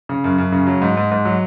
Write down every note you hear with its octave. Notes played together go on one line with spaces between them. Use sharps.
C#3
F#2
F#2
C#3
F#3
G#2
G#2
G#2
F#3